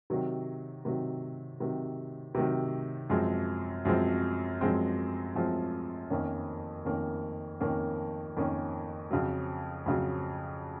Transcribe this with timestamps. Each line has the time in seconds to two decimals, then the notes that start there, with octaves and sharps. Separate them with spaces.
0.10 C3 D#3 F#3
0.85 C3 D#3 F#3
1.60 C3 D#3 F#3
2.35 C3 D#3 F#3
3.10 F#2 F3 G#3 C4
3.85 F#2 F3 G#3 C4
4.61 F#2 F3 G#3 C4
5.35 F#2 F3 G#3 C4
6.10 F2 D#3 A#3 C#4
6.85 F2 D#3 A#3 C#4
7.60 F2 D#3 A#3 C#4
8.37 F2 D#3 A#3 C#4
9.11 F2 C#3 F#3
9.86 F2 C#3 F#3